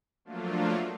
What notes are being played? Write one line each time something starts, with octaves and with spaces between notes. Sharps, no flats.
F3 F#3 A3 A#3 D4 F4